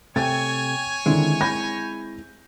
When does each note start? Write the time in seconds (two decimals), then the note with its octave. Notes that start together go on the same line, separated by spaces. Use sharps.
0.16 C3 A3 C#5 G5 G#5 A6
1.06 D3 D#3 G#3 C4 E4
1.41 B5 G6 A#6